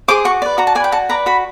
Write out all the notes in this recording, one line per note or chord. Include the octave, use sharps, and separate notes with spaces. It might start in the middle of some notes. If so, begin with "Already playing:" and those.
G#4 C5 D6
F#4 C#6
B4 D5
F#4 A#5
A5
B4 D5 G5 G#5
F#4 A5
B4 D5 A#5
F#4 B5